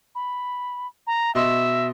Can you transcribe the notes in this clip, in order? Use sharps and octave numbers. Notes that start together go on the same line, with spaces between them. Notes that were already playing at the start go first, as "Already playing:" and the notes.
B5
A#5
B2 D#5 E5 C6